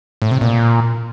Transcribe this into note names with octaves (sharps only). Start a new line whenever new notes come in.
A2
C3
A#2